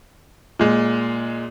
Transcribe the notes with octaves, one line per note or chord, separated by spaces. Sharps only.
A#2 G#3